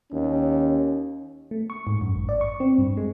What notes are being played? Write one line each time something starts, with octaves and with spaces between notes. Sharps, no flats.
D#2 C#4
A3
C#6
G#2
F#2
G#1
D5
C#6
C4
G2
G#3